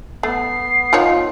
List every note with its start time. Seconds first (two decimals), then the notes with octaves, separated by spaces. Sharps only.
0.23 A3 B3 C7
0.93 D#3 D#4 F4 C#5